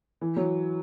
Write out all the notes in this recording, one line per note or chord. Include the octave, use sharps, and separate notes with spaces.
E3
F#3